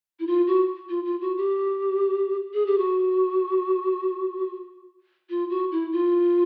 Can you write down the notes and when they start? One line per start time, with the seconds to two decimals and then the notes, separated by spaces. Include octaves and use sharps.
0.19 E4
0.27 F4
0.47 F#4
0.89 F4
1.05 F4
1.21 F#4
1.37 G4
2.53 G#4
2.66 G4
2.78 F#4
5.30 F4
5.50 F#4
5.71 E4
5.92 F4